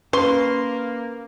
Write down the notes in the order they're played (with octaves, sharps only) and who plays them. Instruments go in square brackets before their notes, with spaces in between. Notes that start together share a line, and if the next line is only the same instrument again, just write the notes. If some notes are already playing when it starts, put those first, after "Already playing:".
[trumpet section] A#3 [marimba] C#4 [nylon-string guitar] B4 [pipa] C6